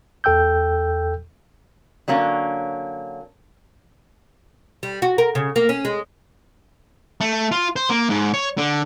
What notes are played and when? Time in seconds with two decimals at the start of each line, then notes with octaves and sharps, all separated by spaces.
0.24 E2 A4 G5 E6 G6
2.08 D3 F#3 A#3 C#4
4.83 G3
5.02 F#4
5.18 A#4
5.35 C#3
5.56 A#3
5.69 C#4
5.85 G#3
7.21 A3
7.52 F4
7.76 C5
7.90 A#3
8.09 G#2
8.34 C#5
8.58 D3